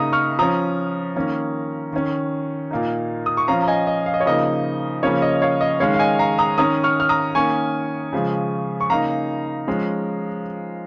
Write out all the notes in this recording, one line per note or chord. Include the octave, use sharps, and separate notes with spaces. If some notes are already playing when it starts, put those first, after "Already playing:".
Already playing: C#3 A#3 D#4 A#5 D#6
C#6 F6
F3 C#4 A#5 D#6
D#3 A#3 C#4
D#3 C#4
A#2 A#3 D#4
D#6
C#6
F3 C#4 F5 A#5
A#5
D#5 G#5
D#5
F5
D#5
C#5
C#3 F3 A#3 D#4 D#5
C#3 F3 A#3 C#4 C#5
D#5
C#5 F5
D#5
D#3 G#3 C#4 C#5 F5
F5
D#5 G#5
F5 A#5
A#5 D#6
D#3 C#4 A#5 D#6
C#6 F6
F6
A#5 D#6
D#3 A#3 C#4 G#5 C#6
C#3 F3 G#3
C#6
C#3 A#3 D#4 F5 A#5
F3 G#3 C#4